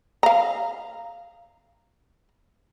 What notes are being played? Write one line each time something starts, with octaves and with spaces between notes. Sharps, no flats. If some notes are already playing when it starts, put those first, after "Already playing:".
F5 A#5